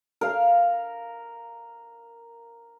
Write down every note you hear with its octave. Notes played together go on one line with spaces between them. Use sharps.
A#4 F5